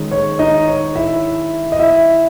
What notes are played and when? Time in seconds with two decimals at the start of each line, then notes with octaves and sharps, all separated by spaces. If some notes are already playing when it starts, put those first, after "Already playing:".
Already playing: D#3 G#3 C#4
0.12 C#5
0.39 D#4 D#5
0.68 C#5
0.95 E4 E5
1.72 D#5
1.79 E4 E5